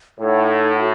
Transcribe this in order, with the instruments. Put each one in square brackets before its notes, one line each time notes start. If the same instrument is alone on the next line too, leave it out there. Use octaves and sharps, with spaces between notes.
[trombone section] A2 [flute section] D#4 A4 C#5 F#5
[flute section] F#4 A4